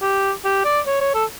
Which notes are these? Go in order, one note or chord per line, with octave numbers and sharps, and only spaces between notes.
G4
G4
D5
C#5
C#5
A4